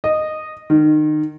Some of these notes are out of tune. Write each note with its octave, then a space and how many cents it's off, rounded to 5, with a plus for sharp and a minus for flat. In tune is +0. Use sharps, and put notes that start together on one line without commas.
D#5 -10
D#3 -30